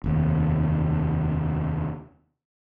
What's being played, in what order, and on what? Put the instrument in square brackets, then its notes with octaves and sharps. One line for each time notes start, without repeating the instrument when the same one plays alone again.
[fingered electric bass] F1 D#2